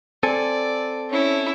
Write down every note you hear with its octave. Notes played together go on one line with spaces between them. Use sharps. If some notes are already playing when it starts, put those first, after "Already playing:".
C4 A4 D5 G#5
C#4 E4